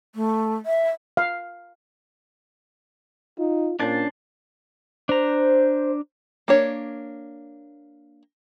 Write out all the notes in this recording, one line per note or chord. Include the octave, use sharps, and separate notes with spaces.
A3
E5
F5
D#4 F4
A#2 C#4 D4 C5 A5
D4 C5 A#5
A#3 D4 C#5